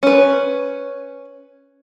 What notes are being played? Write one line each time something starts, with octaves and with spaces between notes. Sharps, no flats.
C#4 B4